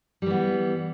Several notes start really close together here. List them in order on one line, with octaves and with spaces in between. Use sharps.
G3 E3 B3